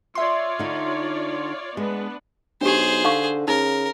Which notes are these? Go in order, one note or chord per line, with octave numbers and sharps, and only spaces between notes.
F4 C#5 D5 E5 C6
D3 D#4
G#3 B3 D4 B4
B1 D4 G4 G#4 C5
D3 D#4 F5 C#6
C#3 D#4 A#4